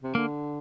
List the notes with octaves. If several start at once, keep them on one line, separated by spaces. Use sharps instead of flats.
C3
D3 A#3